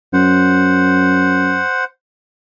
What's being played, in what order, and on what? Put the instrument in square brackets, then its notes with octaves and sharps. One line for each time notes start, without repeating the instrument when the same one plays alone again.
[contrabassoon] F#2 [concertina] C5 F#5